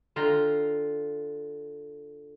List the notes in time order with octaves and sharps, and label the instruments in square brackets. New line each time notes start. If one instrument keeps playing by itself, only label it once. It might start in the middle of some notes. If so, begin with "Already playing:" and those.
[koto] D3 F4 G5 A#5